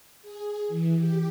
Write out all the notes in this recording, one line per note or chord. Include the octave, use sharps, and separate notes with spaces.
G#4
E3
G4